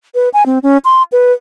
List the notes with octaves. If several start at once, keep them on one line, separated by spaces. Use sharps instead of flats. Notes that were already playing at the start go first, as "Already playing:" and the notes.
B4
G#5
C4
C#4
C6
B4